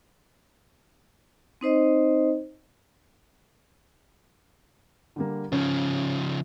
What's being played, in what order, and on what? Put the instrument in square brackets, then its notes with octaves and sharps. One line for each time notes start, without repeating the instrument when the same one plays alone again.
[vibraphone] C4 D#4 C5 D#5
[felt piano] D3 G3 A#3
[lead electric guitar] C#3 F3 [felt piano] C#4